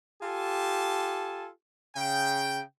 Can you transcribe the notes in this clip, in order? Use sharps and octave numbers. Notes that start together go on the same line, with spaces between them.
F4 G4 A4 G#5 A5
C#3 G5